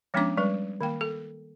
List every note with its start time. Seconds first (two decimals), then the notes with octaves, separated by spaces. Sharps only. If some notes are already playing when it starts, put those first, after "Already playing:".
0.14 F3 G#3 B3 C#4 D4 D6
0.37 G3 G#3 B4
0.81 D#3 A#3 G5
1.01 A4